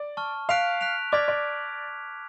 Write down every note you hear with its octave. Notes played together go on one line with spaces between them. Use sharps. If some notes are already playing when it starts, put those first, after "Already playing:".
Already playing: D5
A5 C#6 F6
F5 F#6 B6 D7 F7
F#6 B6 D7 F7
D5 D6 F6 G#6 B6
D5